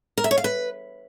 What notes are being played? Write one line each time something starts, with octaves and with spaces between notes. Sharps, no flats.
A#4
E5
C#5
F5
B4